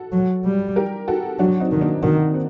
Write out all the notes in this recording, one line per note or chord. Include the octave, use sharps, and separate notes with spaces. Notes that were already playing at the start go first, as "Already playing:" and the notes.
Already playing: F#4 A4
F#3
G3
G4 A#4
F#4 A4
F#3 D4 F#4
C4 D#4
D#3
A#3 D4
D#3 D4 F#4
C4